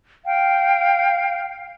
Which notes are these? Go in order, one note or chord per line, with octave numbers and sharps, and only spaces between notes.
F5 G5